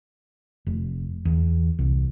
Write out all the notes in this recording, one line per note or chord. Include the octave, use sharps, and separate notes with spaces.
F1
E2
C2